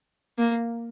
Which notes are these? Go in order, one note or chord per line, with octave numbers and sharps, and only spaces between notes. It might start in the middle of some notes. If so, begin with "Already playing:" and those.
A#3